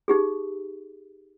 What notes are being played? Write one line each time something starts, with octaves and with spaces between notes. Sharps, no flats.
D#4 G4 G#4